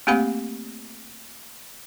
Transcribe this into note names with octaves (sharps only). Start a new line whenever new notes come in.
A3 A#3 C4 G4 F#5 B5